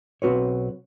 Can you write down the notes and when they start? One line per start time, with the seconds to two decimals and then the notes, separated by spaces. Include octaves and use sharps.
0.22 B1 C4 F#4 B4 C#5